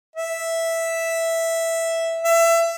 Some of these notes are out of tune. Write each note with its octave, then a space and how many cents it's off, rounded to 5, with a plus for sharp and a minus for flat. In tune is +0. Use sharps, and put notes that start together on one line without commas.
E5 +0
E5 +25